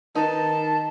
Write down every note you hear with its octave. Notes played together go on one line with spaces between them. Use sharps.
D#3 D#4 B4 A5